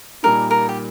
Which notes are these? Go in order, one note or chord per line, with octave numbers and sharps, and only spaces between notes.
A#2 G3 A#3 D#4 A#4
A#4
G4